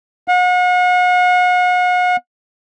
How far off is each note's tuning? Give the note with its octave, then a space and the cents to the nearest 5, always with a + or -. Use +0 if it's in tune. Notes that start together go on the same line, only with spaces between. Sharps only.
F#5 -40